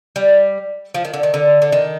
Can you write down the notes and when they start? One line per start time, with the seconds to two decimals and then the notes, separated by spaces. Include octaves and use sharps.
0.16 G3
0.94 F3
1.05 D#3
1.14 D3
1.23 D#3
1.34 D3
1.62 D3
1.72 D#3